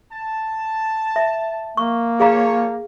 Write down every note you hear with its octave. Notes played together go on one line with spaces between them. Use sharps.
A5
E5
A#3 C#6
F3 G#4 C#5 F5 A#5